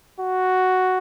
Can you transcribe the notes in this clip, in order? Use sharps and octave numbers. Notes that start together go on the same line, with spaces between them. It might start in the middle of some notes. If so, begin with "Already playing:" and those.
F#4